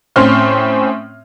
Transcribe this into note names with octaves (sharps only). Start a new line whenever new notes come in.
A2 C4 C#4 C6 F6